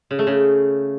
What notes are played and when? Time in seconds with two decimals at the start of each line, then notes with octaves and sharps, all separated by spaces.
0.11 C#3
0.19 A3
0.27 C#3